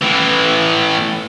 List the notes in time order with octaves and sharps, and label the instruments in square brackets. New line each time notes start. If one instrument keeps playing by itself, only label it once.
[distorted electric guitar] A2 E3